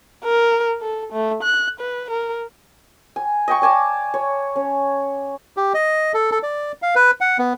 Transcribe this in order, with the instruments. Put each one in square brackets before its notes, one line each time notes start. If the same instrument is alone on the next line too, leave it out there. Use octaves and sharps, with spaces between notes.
[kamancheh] A#4
A4
A3
F#6
B4
A#4
[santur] G#5
D#5 G5 C#6
D5 G#5 A5 D6
C#5
C#4
[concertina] G4
D#5
A4
A4
D5
F5
B4
F#5
B3